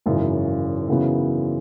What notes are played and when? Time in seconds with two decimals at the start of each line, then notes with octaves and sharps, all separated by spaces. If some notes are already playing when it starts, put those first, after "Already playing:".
0.06 G#1 F#2 C#3 E3
0.88 F#2 C#3 E3 B3 F#4